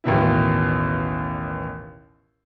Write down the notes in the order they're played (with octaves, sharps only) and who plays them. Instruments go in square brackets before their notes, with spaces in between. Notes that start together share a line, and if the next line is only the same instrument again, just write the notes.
[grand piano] A1 D#2 B2 E4